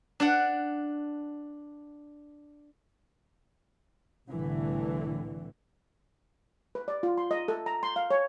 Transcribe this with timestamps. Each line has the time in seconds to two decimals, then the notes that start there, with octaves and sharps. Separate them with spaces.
0.20 D4 D5 F#5
4.31 C2 A2 D3 E3
6.75 B4
6.88 D5
7.03 F4
7.18 C6
7.31 D#5
7.48 A4
7.66 A#5
7.83 C6
7.96 F5
8.11 C#5